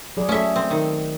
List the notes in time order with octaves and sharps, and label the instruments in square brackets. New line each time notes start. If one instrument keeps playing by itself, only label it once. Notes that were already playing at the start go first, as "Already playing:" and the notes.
[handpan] F#3 G#4 D5
[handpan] A3 A4 [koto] C#4 E5
[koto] C4
D#3